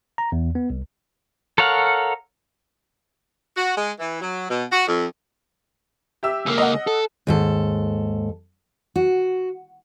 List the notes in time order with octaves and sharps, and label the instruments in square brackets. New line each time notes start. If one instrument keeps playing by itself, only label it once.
[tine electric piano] A#5
E2
B3
C2
[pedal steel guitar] A4 A#4 C#5 F5 F#5
[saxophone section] F#4
G#3
E3
F#3
B2
F#4
F2
[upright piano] G4 E5 E6
[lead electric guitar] C#2 A#3
[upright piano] D#5 F#5
[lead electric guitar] A4
[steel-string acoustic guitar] D#2 G#2 A4
F#4